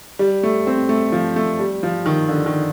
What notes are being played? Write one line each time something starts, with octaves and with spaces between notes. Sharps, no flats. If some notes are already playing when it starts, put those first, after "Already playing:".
G3
A3
C4
A3
F3
A3
G3
F3
D#3
D3
D#3